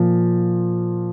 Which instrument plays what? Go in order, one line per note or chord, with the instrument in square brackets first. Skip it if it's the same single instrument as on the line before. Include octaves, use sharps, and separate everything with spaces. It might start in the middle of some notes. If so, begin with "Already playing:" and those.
Already playing: [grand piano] A#2 F3